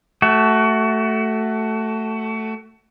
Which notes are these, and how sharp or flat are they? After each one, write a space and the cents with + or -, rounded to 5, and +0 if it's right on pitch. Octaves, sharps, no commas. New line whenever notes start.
A3 +0 F#4 +25